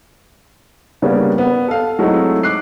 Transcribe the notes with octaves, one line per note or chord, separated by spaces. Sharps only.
C#3 G3 A#3 B3 C#4 D4
B3
A4 F5
F#3 G#3 A3 C4 D#4 E4
D6 F#6 C7